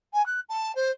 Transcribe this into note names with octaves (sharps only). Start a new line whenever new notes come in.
G#5
F#6
A5
C5